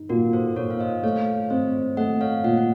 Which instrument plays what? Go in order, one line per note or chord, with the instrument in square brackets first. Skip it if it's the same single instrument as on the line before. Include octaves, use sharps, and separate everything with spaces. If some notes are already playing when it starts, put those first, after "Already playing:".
Already playing: [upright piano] D#4
[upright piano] A#2 [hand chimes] F#4 A#4
[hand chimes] A4 C5
[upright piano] A#2 [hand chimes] A#4 C#5
[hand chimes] F5
C5 D#5
[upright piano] A3 [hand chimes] C#5 F5
[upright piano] C4 [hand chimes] C5 D#5
[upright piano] A3 [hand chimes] D#5 F#5
[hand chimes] C#5 F5
[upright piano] A#2 [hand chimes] D#5 F#5
[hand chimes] F#5